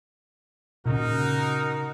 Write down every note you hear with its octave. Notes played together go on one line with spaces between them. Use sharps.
A#2 C#3 D#4 F#4 A#4